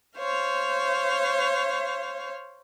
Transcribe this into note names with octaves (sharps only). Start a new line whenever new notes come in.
C5 C#5 F5